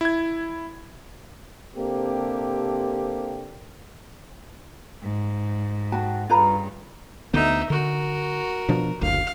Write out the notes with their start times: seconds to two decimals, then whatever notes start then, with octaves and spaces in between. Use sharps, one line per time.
0.01 E4 G#6
1.76 C3 A#3 C4 D4 G4 A4
5.01 G#2
5.92 F#4 G5 A5
6.29 G2 C#3 F4 B4 A#5
7.34 D2 D3 B3 D#4 E5
7.70 D3 F#4 A#4
8.69 B2 F3 D4
9.01 F#1 D2 F5